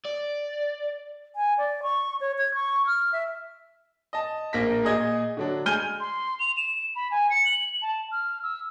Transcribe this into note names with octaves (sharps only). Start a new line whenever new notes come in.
D5
G#5
D5
C#6
C#5
G#6
C#6
F6
E5
D#5 A5
A#1 A#3 A#6 B6
A#2 G#4 D#5 G#6
D3 F#3 D4
G#3 G#5 F6 G6 D#7 G7
C6
F7
E7
B5
G#5
C#7
F#7
A5
F6
E6